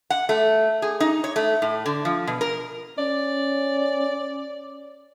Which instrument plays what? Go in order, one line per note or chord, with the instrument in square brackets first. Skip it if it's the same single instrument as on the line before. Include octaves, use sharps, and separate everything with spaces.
[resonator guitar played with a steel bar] F#5
A3
G#4
D#4
C#5
A3
A2
D3
F3
B2
A#4
[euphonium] C#4 [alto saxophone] D5